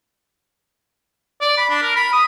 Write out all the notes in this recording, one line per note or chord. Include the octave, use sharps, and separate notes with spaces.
D5
B5
D4
A#4
B5
D#6